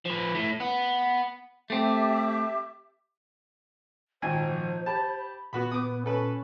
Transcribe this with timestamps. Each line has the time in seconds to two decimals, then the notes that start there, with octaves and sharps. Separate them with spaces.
0.06 F3 B4
0.35 A2
0.60 B3
1.70 A3 C4 G4 E5 D6
4.22 G#1 A#2 C5 G5 G#5
4.51 F3
4.86 G4 A5 B5
5.53 A#2 B3 F#4 B5
5.71 B3 D6 D#6
6.06 C#4 A4 B4